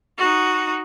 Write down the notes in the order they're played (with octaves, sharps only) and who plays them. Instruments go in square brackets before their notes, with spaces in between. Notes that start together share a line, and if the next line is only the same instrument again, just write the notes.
[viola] D#4 F#4